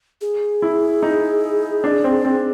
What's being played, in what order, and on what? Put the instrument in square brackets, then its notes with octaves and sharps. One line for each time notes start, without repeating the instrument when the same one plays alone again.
[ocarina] G#4
[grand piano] E4
D#4
D4
C4
C4